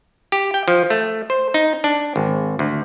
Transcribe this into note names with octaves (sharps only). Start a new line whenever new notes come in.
G4
G5
F3
A3
C5
D#4
D4
G#1
D2